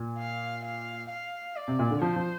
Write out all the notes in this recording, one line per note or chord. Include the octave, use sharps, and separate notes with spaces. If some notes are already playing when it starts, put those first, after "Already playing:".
Already playing: A#2
F5
F5
F5
D5
C3
A#2
D3
F3 C5
F3